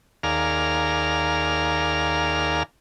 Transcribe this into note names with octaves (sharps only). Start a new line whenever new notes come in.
D#2 G#4 A#4 D5 F5 F6